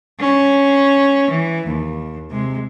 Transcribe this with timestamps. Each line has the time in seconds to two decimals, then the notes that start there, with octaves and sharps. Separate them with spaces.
0.20 C#4
1.30 E3
1.66 D#2
2.30 C3 G#3